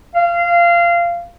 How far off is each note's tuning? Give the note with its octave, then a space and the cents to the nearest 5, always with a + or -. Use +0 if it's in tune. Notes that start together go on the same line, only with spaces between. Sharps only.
F5 -20